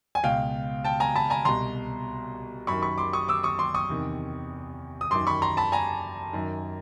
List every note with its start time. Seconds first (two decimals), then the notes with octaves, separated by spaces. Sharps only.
0.15 G#5
0.23 C#2 B2 F5 G5
0.84 G5 A5
1.00 G#5 A#5
1.15 A5 B5
1.30 G#5 A#5
1.45 C2 B2 A#5 C6
2.67 F#2 D#3 B5 C#6
2.82 B5 C#6
2.98 C6 D6
3.13 C#6 D#6
3.28 D6 E6
3.43 C#6 D#6
3.59 C6 D6
3.74 C#6 D#6
3.90 E2 C3 D#3
5.01 D#6
5.11 F#2 D#3 C6 D6
5.27 B5 C#6
5.42 A#5 C6
5.57 A5 B5
5.72 G#5 A#5
6.33 F#2 D#3